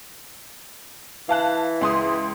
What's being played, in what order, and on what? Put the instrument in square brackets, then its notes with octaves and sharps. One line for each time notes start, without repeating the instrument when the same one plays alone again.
[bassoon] E3 [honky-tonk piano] F5 A5 F#6
[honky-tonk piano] C#2 C6 D#6